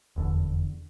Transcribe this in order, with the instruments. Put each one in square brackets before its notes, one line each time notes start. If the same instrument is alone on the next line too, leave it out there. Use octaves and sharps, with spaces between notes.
[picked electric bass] F1 E2 D3